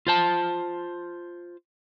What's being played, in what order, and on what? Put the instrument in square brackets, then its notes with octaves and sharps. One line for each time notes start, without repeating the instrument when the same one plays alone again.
[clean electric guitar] F4 C5 A5